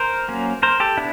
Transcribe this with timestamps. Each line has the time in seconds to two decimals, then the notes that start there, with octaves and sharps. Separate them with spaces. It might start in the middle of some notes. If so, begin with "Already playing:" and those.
Already playing: A#4 C5
0.28 F#3 A#3 C#4
0.63 A#4 C5
0.80 G4 A4
0.97 B3 D4 E4